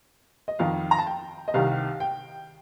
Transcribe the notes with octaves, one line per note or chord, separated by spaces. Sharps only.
D#5
F2 D#3 F5
A#5
A5
G5
D#5
C2 C3 D#3 F5
G5